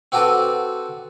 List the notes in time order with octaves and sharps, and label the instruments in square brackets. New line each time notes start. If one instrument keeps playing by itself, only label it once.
[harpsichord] C4 F#4 G4 A4 B4